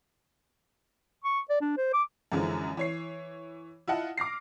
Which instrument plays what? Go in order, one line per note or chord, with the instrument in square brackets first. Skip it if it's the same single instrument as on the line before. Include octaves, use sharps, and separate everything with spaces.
[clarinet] C#6
D5
D4
C5
D6
[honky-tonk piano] F#2 D3 E3 F3 G#3
E3 C#5 C7
E4 F4 D#5 F#5 A5
D6 F6 A#6 C7